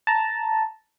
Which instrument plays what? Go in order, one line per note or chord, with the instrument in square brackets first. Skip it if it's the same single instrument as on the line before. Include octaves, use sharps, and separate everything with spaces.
[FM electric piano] A5 A#5